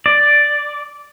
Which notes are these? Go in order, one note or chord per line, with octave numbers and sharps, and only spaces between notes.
D5